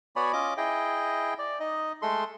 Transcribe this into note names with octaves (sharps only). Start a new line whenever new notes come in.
B3 F#4 C#5 D5 G#5 B5
C#4 F4 D#5 D6
E4 G#4 D#5 G5
D5
D#4 D#5
G#3 A3 A4 C6